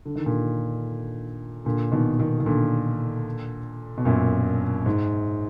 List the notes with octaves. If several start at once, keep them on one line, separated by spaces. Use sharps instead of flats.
D3
D#3
A#2 D3
A#2 D3
B2 D#3
B2 D#3
D#3
A#2 D3
B2
F#2 A#2
G#2